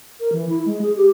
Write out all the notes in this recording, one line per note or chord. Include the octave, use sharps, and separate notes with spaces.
A#4
E3
E4
G#3
G#4
G4